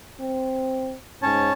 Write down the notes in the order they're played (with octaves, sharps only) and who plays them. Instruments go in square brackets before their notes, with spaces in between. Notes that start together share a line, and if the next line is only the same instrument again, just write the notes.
[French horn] C4
[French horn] G#2 [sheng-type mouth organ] C#4 C#5 A5